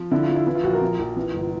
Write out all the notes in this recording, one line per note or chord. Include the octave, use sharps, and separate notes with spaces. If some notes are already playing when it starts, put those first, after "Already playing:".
Already playing: F3
D3 E4
F4
F3
E4
E3 E4
F4
A#1 F#4
A#4
F3
A#1
E3
G1